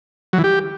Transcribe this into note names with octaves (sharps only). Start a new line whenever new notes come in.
F#3
E3
G4